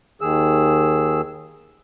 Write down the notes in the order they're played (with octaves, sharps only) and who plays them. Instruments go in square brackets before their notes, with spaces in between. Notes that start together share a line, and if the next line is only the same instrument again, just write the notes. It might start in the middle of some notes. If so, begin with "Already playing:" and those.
[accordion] D#2 D#3 G#4 E6